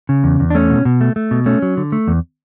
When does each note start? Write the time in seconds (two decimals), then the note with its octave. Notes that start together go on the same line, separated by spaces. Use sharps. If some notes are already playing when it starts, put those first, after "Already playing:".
0.09 C#3
0.24 E2
0.40 E2
0.50 D4
0.55 A3 C#4
0.70 B2
0.85 B2
1.01 A3
1.16 A3
1.31 B2
1.46 A3 C#4
1.62 F#3
1.77 D3
1.92 A3
2.07 E2